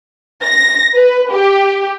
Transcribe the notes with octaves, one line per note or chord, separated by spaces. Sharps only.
A#6
B4
G4